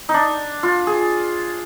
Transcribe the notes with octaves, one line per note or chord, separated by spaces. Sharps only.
D#4
D4
F4
G#4